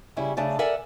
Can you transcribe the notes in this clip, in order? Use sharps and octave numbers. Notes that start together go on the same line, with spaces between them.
C#3 G3 C#4 E4 G#4
C#3 A3 D4 G#4
A4 A#4 D5 E5 F#5 G#5